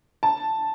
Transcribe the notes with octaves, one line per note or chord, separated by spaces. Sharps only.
A5